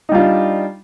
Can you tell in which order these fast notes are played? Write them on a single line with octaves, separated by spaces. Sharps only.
D#4 G3 F4 D4